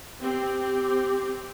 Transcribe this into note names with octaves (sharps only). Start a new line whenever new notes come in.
C4 G4